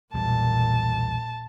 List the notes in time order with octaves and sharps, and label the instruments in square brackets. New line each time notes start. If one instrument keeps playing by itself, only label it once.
[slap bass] B1 E2 G3 [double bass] A#2 [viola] A5